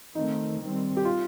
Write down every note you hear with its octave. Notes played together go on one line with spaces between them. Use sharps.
D#3 A3 C4 D#4
D#3 G3 C4
G4
F4